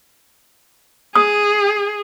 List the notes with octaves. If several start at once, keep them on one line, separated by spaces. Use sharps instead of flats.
G#4 D#6